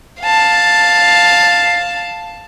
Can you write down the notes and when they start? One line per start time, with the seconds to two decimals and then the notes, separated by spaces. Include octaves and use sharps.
0.22 F5 A5